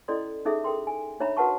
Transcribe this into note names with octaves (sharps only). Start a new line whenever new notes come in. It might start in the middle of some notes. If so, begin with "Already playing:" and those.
C#4 E4 A4 D5 D#5 C6
C#4 D#4 G#4 A4 E5
A4 A#4 G5 C6
G#5
D4 D#4 C#5 E5 A#5 B5
F#4 A#4 B4 F#5 A5 C#6